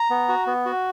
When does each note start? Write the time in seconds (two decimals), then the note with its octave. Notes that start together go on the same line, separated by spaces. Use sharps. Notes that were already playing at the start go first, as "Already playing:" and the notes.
Already playing: A#5
0.10 B3
0.29 F#4
0.47 B3
0.66 F#4